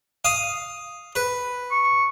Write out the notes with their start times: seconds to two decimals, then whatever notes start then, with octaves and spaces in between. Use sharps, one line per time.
0.25 F5 D#6
1.15 B4
1.71 C#6